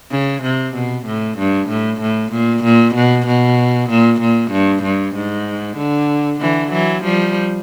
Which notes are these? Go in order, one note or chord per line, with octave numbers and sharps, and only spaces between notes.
C#3
C3
B2
A2
G2
A2
A2
A#2
A#2
B2
B2
A#2
A#2
G2
G2
G#2
D3
D3 E3
E3 F#3
F3 G3